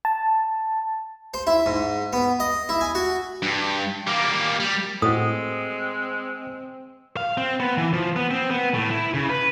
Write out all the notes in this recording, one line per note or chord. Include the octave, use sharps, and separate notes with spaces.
A5
C5
E4
G#2
B3
D#5
E4
G#5
F#4
G2
G3 A#3
G3
A2 G#3 C4 F#4 D#6
F5
C4
B3
E3
F3
B3
C4
B3
A2
E4
C#3
B4